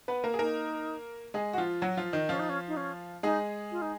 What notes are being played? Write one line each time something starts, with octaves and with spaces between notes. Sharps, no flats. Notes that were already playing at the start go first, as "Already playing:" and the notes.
B3 B4
A#3 A#4
G#4
A#3 D#4 A#4
G#3 G#4
F#4
F3 F4
F#3 F#4
F3 F4
D#3 D#4
F3 C#4 F4
D#4
C#4
D#4
C#4
G#3 D#4 G#4
F4
D#4